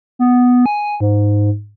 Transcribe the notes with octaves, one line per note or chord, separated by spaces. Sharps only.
B3
G#5
G#2